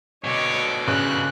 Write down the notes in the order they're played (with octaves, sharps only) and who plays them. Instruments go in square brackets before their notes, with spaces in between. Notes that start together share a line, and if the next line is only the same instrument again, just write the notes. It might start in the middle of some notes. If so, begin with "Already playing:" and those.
[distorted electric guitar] B2 D3 [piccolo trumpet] C#5 [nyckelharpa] D#5 D6
[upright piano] C#3 [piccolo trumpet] F#6